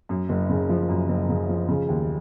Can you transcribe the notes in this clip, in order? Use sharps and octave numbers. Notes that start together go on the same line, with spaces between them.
F#2
F#1
C#3
F3
F#2
F#1
C#3
F3
C#3
D#2